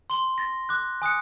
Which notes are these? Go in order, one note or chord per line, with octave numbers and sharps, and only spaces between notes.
C6 G7
A6 A#6
D6 F#6
G#5 D#6 F#6 C#7